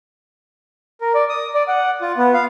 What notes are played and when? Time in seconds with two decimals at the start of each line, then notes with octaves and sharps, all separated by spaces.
1.01 A#4
1.15 D5
1.29 D#6
1.54 D5
1.68 F#5
2.02 F4
2.17 B3
2.34 F5